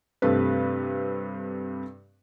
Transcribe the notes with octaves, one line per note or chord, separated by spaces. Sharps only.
G2 C3 A3 B4